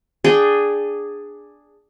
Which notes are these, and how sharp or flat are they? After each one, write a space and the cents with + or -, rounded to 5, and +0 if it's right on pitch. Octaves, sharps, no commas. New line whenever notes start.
D4 +0 G#4 -5 G5 -20